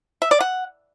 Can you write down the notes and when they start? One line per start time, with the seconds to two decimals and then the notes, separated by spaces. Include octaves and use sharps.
0.22 E5
0.31 D5
0.40 F#5